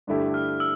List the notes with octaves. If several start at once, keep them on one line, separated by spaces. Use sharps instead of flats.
G2 D3 A3 E4 G4
F6
E6